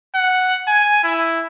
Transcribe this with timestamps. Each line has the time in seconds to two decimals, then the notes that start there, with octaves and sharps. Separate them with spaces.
0.15 F#5
0.68 G#5
1.04 E4